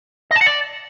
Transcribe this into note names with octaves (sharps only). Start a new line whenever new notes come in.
D#5
A5
F#5
D5